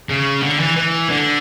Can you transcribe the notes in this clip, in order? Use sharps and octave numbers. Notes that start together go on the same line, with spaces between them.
C#3
D3
E3
E3
D3